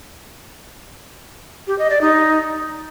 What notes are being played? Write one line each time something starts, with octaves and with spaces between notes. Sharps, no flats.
G4
D#5
D5
D#4